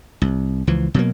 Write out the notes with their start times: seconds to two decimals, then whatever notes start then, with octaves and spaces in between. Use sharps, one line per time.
0.22 C2
0.67 C#2 E3 F3
0.94 B2 F#3 A#3